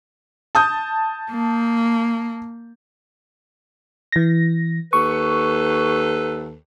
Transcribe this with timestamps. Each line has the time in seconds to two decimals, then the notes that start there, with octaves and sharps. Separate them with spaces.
0.55 A5 D#6 G6
1.31 A#3
4.12 E3 A#6
4.93 D#2 A4 B4 C#6